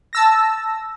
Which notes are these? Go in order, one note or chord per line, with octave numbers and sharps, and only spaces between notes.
A5 E6 A#6